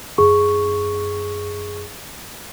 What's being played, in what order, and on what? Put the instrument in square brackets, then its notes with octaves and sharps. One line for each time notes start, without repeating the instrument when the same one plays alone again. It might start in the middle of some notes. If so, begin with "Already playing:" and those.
[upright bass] F#2 E4 [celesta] G#4 C#6